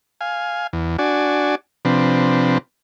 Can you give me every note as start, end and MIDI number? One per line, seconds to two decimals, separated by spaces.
0.21 0.67 77
0.21 0.67 80
0.73 0.97 40
0.99 1.55 62
0.99 1.55 66
0.99 1.55 74
0.99 1.55 80
1.85 2.58 48
1.85 2.58 53
1.85 2.58 60
1.85 2.58 62
1.85 2.58 71